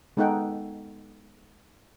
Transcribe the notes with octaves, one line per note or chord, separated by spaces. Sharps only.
G#3 B3 D#4 A4 F#5 G5